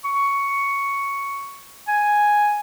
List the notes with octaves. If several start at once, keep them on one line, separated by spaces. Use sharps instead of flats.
C#6
G#5